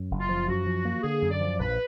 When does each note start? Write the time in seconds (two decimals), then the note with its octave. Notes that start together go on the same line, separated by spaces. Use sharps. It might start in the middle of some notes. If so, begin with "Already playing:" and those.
Already playing: F#2
0.11 F#1
0.20 F4
0.29 F3
0.48 F#2 F#4
0.66 F3
0.85 A#3
1.03 D3 G#4
1.22 F#2
1.31 D5
1.41 F3
1.59 A#1 B4